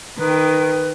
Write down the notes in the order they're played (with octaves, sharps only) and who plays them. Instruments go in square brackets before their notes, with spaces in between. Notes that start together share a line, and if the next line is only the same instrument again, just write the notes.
[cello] D#3 G5 [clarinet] B4